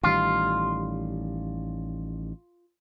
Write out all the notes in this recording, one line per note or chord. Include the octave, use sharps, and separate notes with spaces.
A1 D#3 G3 F4